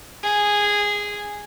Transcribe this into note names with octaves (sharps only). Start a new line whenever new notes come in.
G#4